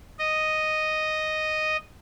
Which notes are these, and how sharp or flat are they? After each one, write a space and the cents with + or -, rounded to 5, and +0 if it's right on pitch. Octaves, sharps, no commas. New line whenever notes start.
D#5 -5